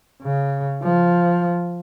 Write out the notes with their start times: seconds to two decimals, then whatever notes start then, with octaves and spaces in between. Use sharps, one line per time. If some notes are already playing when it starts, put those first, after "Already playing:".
0.23 C#3
0.83 F3